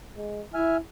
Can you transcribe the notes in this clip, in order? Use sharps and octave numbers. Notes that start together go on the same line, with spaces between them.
G#3
E4 E5 G#5 F6